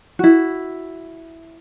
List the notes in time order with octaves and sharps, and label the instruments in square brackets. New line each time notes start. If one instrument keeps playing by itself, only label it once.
[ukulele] E4 F#4